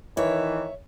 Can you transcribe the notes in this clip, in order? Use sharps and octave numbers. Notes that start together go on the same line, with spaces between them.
D#3 E3 C#5 E5